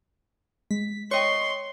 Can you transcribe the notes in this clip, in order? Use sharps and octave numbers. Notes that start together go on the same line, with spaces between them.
G#3 B6
C#5 D#5 G5 C6 C#6